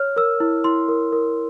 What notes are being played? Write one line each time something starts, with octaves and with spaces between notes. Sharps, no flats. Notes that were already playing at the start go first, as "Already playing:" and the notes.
Already playing: C#5 F6
A#4 E6
E4
E4 C6
A#4
A#4